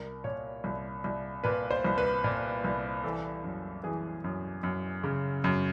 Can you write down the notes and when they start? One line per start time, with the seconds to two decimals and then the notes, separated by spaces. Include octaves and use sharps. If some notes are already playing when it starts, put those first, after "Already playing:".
Already playing: C2 A#4
0.24 A#2 C#5
0.64 C2
1.04 C2
1.44 A#2 B4
1.71 C5
1.84 C2
1.98 B4
2.24 A#2
2.64 C2
3.04 E3 A4
3.44 F#2
3.84 E3 G#4
4.24 F#2
4.63 F#2
5.04 C#3
5.44 F#2